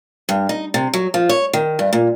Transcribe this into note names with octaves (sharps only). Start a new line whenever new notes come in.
G2
D#4
C3
F#3
F3
C#5
D#3
G2
A#2